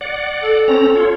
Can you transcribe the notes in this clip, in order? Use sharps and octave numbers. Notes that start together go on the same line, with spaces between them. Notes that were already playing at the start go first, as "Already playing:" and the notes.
D5 F#5
A4
C4 C#4 A#5
F4 C#5